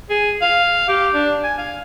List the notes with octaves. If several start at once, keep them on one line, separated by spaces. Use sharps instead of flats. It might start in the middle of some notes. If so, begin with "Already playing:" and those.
G#4
F5
G4
D4
G#5
F5